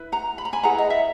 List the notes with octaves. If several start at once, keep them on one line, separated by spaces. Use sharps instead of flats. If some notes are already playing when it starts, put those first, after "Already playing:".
Already playing: E4 B4
F#5 A#5
B5
A#5
G#5 B5
E4 G#4 B4 F#5 A#5
D#5
E5